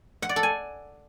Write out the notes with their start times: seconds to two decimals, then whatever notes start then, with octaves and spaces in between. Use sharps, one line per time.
0.22 F#5
0.29 D5
0.36 A4
0.43 G#5